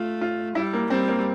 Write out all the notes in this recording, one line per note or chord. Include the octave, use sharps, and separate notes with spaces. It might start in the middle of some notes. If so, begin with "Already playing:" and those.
Already playing: A3 F4
F4
G3 E4
A#3
G3 C4
A#3